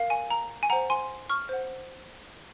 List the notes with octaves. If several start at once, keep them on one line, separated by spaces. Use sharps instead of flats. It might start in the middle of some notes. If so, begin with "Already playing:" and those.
Already playing: A#4 F5
G#5
A#5
G#5
C5 F#5 A#5
G#5 C6
C#6 F6
C5 F#5